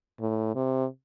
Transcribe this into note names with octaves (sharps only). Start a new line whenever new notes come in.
A2
C3